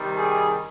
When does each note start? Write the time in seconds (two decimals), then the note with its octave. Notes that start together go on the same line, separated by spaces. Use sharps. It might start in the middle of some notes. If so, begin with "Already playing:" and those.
Already playing: C3 D#3 G3
0.17 G#4